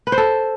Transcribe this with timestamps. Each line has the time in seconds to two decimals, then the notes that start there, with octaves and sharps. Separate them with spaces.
0.07 B4
0.12 C5
0.18 A4